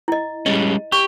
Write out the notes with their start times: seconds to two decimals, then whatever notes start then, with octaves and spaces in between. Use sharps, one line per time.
0.08 E4 D#5
0.46 G3 G#3 C#4 D#5
0.92 G4 C#6